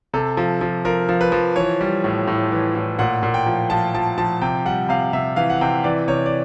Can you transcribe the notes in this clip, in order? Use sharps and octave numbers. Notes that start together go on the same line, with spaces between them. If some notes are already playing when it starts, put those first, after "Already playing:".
C3 A4
F3
F3
F3 A#4
F3
B4
F3
E3 C#5
G3
A2
A2
E3
A2
A#2 F#5
A#2
G5
F3
F3 A5
F3 A5
F3 A5
C3 G5
G3 F#5
C3 F5
C3 E5
E3 F5
F#5
C3 G5
E3 D5
C3 C#5
D5